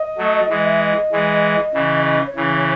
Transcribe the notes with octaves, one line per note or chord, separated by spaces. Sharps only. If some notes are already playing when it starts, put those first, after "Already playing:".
Already playing: D#5
F#3 A3
E3 G#3 D#5
E5
D#5
E3 G#3
C#3 E3
D#5
C#5
C#3 E3